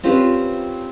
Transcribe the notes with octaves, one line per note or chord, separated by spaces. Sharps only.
C4 C#4 F4 G4 B4